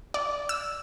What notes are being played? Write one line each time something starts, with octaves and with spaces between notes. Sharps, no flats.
D5
E6